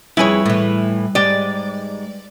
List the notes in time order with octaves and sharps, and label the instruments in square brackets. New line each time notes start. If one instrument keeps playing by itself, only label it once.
[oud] F2 G#4 [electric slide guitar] G3 B4 [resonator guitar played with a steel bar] E4 C#5
[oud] A2 E3
[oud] G#2 G#3 G4 [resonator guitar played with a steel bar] D5